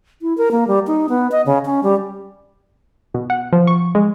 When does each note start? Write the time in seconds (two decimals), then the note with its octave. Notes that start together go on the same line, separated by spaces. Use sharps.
0.22 E4
0.38 A#4
0.51 A#3
0.68 G3
0.87 D#4
1.09 B3
1.32 D#5
1.46 C#3
1.65 C#4
1.83 G3
3.14 B2
3.30 F#5
3.53 F3
3.67 C#6
3.95 G#3